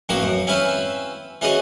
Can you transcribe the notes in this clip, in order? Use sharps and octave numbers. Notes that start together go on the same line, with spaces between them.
A1 F3 A#3 C4 F#4 A#5
F#2
C4 C#4 E4 B4 E5 F5
E3 C#4 F#4 G#4 D#5